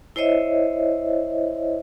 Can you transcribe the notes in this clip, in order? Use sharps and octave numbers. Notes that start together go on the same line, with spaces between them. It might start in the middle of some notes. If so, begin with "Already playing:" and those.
E4 C5 C#5 D#5 E5